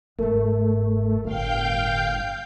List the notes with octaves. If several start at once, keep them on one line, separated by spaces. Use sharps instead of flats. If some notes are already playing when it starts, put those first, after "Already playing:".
G1 G#2 A3 A#4
G1 A2 F5 G5 G6